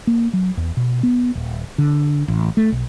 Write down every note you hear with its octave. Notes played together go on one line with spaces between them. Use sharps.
A#3
F#3
E2
B2
B3
D#1
D3
A1
A3
B1